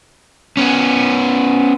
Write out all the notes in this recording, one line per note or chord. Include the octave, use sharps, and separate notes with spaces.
B3 C#4